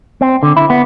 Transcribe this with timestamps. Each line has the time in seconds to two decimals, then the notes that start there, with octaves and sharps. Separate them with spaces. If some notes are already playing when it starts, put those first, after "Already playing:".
0.21 C4
0.43 D3
0.57 E4
0.70 B3